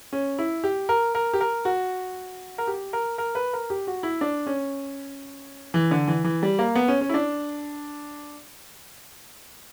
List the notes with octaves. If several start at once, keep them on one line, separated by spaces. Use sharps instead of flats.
C#4
E4
G4
A#4
A#4
G4
A#4
F#4
A#4
G4
A#4
A#4
B4
A#4
G4
F#4
E4
D4
C#4
E3
D3
E3
E3
G3
A#3
B3
C#4
C#4
E4
D4